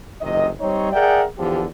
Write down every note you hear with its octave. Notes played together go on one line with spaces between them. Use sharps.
F#1 C3 D#3 D#5
G3 C4 D#4 C#5
G#4 A#4 D5 E5 F#5 G5
E2 D3 F3 G4